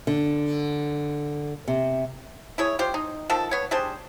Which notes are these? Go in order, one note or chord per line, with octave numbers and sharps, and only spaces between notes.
D3
C3
E4 G#4 C#5
F4 G4 C5
D#4
D#3 F3 A4
B3 C#5
G3 D4 G#4 C5